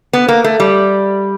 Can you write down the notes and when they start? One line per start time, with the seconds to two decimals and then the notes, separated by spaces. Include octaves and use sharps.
0.13 B3
0.28 A#3
0.44 A3
0.60 G3